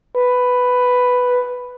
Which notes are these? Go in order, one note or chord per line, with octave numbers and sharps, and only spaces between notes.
B4